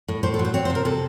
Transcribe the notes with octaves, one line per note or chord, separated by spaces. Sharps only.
A2
A2 C5
A4
F#3
C5
C4 C#5
C5
C3
A#4
C3 A4